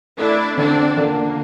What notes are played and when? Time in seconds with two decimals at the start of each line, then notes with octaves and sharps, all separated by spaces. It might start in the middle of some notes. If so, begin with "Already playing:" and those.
0.18 A3 D4 E4
0.57 D3 C4 D4
0.97 D3 A#3